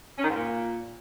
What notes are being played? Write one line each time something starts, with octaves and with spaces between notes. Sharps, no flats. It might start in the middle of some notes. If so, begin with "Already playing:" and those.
C#4
D#3
G#2
A#2